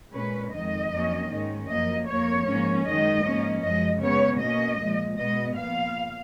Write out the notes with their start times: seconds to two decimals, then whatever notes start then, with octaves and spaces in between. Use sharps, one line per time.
0.14 A#2 G#3 C#4 B4
0.53 F2 D#3 G#3 D#5
0.92 F2 D#3 F#3 A#3 C#4
1.31 G#2 D#3 G#3 C#4
1.69 F#2 F3 A#3 D#5
2.08 F2 F3 A#3 C#5
2.47 G#2 F3 A#3 C#4
2.85 F#2 D#3 G#3 D#5
3.24 G#2 F3 A#3 C#4
3.63 F#2 F3 G#3 D#5
4.01 C#3 G#3 B3 C#5
4.40 B2 A#3 C#4 D#5
4.79 A#2 F3 G#3
5.18 B2 G#3 B3 D#5
5.56 A#2 F3 B3 F5